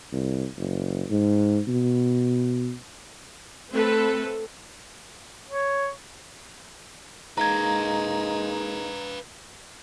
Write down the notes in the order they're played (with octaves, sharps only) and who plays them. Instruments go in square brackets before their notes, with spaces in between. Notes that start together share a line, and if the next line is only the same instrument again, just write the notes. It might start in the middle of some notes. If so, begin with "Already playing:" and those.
[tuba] C2
F#1
G#2
B2
[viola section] A3 C4 A4 B4
[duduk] C#5
[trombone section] G#3 A#3 D#4 [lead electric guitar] B4 F5 [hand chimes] A#5 G#6